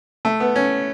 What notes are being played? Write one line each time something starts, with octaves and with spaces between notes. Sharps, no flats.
A3
B3
C#4